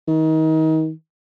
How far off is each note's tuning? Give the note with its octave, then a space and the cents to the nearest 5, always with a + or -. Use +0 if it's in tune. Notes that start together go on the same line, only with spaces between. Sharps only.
D#3 +30